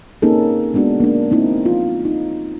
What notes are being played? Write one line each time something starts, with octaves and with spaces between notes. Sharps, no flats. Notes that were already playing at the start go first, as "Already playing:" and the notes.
A#3 C4 C#4 D#4 G#4 A4
G#3 B3 D4 F#4
A#3 D4
A#3 C4 D#4 E4
F4
D#4